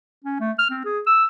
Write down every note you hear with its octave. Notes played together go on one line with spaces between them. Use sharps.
C#4
A3
F6
C4
G#4
E6